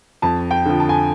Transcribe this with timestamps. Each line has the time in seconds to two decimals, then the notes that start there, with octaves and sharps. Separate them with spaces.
0.22 F2 A5
0.51 G5
0.66 D3 F3
0.80 A5
0.89 G#5